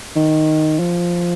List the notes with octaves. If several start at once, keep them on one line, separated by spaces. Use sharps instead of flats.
D#3
F3